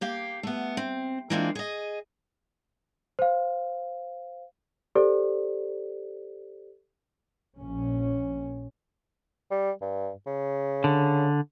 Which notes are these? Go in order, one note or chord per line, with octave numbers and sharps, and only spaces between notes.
A#3 G4 F5
A3 B3
C4
E3 G#3 A#3 C4 D4 F4
G#4 D#5
C5 F5
G4 A4 C5 D5
A#1 C#4
G3
G2
C#3
D3